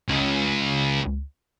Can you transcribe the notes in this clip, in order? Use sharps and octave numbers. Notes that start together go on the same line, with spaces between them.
C#2 C#3